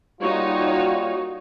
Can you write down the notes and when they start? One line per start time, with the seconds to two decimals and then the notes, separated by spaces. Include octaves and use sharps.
0.21 G3 A#3 D#4 F4 F#4 C#5